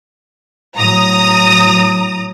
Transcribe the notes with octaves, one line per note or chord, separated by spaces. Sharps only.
A2 F#3 A#5 D#6